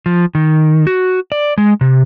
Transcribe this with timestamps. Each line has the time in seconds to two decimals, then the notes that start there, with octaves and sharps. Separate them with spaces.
0.06 F3
0.35 D#3
0.87 F#4
1.32 D5
1.58 G#3
1.81 C3